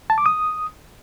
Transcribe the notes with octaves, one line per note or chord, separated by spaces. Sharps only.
A5
D6
D#6